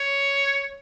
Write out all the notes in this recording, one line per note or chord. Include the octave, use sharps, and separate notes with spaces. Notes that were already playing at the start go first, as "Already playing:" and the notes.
Already playing: C#5